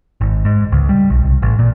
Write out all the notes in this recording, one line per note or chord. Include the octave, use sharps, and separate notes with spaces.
G#1
G#2
C#2
G3
B1
C2
A1
A#2